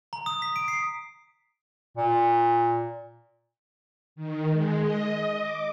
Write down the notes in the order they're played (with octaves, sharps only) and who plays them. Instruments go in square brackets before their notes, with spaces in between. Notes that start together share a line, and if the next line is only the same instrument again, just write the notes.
[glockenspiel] A#5
D#6
B6
D7
C7
[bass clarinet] A#2
[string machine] D#3
G#3
D#5
D6